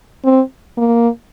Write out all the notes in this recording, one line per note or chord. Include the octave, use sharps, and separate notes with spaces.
C4
A#3